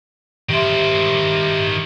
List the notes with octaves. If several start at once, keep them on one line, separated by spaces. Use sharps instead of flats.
D#3 G4 C5 E5